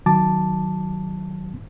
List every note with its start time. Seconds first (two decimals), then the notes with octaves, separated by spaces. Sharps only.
0.06 D#3 F#3 A5 D6